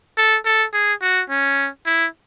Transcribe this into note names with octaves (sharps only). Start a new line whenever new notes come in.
A4
A4
G#4
F#4
C#4
E4